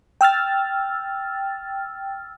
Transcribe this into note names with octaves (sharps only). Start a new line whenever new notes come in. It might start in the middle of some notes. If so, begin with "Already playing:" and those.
G5 E6 F6 A6